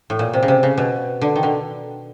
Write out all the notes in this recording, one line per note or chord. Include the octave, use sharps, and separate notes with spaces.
A2
A#2
C3
C#3
C3
C#3
B2
D3
D#3
D3